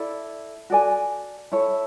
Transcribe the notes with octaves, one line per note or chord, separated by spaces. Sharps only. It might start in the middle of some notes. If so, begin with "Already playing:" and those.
Already playing: E4 A4 D5
F#4 A4 D5 G#5
E4 A4 C#5